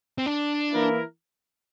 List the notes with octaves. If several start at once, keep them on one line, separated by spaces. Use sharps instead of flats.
C4
D4
E3 A#3 E4 A#4